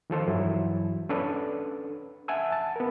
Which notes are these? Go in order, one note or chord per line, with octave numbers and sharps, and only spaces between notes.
D#3 F3 A4 C5
G2 E3 F#3 E4
C#4 D4 A4 B4
E5 F#5 G#5 A5 E6
A5
B3 A#4